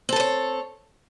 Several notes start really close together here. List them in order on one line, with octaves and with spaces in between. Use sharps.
C4 A4 B4 C#5